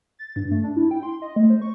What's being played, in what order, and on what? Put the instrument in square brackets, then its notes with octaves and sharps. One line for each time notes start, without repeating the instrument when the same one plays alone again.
[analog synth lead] A6
G2
A3
D4
E4
G5
C6
D#5
A3
C5
C#6